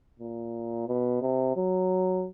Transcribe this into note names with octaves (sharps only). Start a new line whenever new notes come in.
A#2
B2
C3
F#3